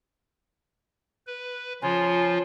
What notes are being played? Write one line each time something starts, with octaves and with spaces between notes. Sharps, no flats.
B4
C#3 F3 F4 G#5